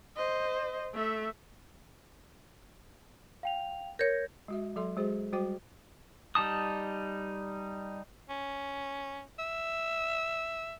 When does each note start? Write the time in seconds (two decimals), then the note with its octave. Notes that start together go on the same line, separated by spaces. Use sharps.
0.16 C5 D#5
0.94 A3 E5
3.43 F5 G5 F7
3.99 A#4 C#5 G6 G#6 A#6
4.48 G#3 F#4 E5
4.76 F#3 A4 E5 C6
4.97 G#3 F#4 G#4 C5
5.33 G3 F#4 C5 G5 D6
6.35 G3 D#4 A5 D#6
8.29 C#4
9.39 E5